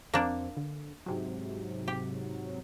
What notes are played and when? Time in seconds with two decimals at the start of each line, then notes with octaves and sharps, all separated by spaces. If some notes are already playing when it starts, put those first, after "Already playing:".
0.14 F2 A#3 C4 D4
0.57 D3
1.06 G#2 C3 F#3
1.88 G4